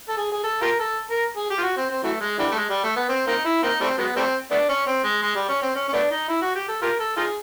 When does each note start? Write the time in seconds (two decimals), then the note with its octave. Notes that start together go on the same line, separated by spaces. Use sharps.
0.09 A4
0.17 G#4
0.32 G#4
0.44 A4
0.62 F4 G4 A#4
0.80 A4
1.10 A#4
1.37 G#4
1.50 G4
1.58 F4
1.63 F#4
1.77 C4
1.90 C4
2.03 E3 F#3 A3
2.21 G#3
2.39 D3 E3 G3
2.52 A3
2.56 G#3
2.69 G3
2.84 A3
2.96 B3
3.09 C4
3.27 A#3 C4 D#4
3.45 E4
3.63 A#3 C4 D#4
3.80 G3 A3 C4
3.98 F#3 G#3 B3
4.16 G3 A3 C4
4.51 A3 B3 D4
4.69 C#4
4.87 C4
5.04 G#3
5.22 G#3
5.35 G3
5.49 C#4
5.62 C4
5.76 C#4
5.88 C#4
5.93 A3 B3 D4
6.11 D#4
6.28 E4
6.42 F#4
6.55 G4
6.68 A4
6.82 F4 G4 A#4
7.00 A4
7.17 D#4 F4 G#4